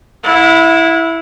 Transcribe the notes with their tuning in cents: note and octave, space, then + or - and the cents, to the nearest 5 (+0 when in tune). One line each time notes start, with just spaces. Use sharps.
E4 +0 F#5 -40